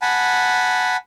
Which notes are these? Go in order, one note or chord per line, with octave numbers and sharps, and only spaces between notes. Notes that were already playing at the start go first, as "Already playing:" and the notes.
F#5 G#5 A5 B5